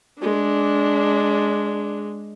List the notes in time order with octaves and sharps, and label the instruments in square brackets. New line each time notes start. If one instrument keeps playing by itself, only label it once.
[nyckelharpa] G#3 [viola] D4